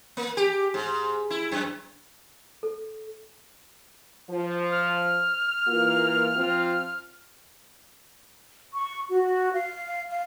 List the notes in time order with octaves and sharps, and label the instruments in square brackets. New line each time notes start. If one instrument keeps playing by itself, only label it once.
[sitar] A#3
G4
G#2
E4
F#2
[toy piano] A4
[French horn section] F3
[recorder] F6
[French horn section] E3 A#3 F4
F3 C4 F4
[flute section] C#6
F#4
F5
F5